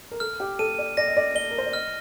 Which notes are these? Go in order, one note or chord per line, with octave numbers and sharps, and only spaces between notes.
A#4
A4 F6
G4
A4 D#7
D5
D5 A#6
D#5
D5
D5 G7
A#4
C5
D5
D#5 F6